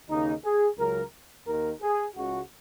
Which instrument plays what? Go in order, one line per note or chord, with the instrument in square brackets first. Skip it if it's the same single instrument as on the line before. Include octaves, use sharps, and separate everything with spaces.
[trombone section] D#2 C#3 A#3 D#4
G#4
C#2 C#3 F#3 A#4
D#2 D#3 A#3 A#4
G#4
C#2 C#3 G#3 F#4